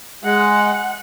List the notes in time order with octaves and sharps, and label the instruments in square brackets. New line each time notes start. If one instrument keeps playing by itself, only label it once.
[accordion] G#3 [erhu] F#5